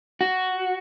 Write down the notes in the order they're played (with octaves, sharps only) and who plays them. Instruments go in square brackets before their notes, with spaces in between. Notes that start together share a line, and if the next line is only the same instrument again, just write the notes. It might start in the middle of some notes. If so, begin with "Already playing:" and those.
[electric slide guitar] F#4